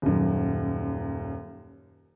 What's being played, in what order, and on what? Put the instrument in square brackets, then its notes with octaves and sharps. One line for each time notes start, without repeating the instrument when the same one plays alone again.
[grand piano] D#1 F#2